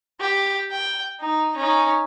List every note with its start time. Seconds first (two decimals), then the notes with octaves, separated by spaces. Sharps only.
0.20 G4
0.71 G5
1.20 D#4
1.57 C#4 D#4